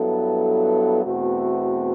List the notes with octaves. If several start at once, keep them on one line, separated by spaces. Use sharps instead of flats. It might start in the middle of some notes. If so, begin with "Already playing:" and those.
Already playing: G2 F#3 B3 E4 A4
E2 B2 A3 C4 F#4